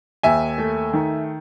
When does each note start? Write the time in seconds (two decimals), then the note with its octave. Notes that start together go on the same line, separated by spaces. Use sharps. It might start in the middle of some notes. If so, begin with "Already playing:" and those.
0.23 D#2 E5 G#5
0.58 A3
0.94 D#3